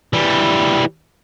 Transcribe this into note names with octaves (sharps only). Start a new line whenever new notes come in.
E3 G3